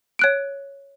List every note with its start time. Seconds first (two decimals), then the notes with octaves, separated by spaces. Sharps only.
0.19 C#5 F#6 D7